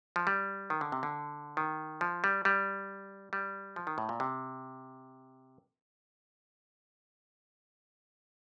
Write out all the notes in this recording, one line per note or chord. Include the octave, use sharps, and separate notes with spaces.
F3
G3
D#3
D3
C3
D3
D#3
F3
G3
G3
G3
F3
D#3
A2
A#2
C3